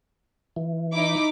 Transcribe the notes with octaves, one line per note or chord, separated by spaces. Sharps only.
E3
D#4 E4 D6